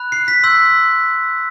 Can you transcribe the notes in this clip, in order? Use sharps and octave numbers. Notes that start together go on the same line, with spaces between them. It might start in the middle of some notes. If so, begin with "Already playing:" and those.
Already playing: B5 F#6
C7
B6
C6 E6 G6